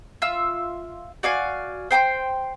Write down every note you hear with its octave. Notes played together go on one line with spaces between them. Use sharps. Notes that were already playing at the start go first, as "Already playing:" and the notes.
F4 E5 E6
F#4 D5 F5 G#5
C5 G5 B5 C6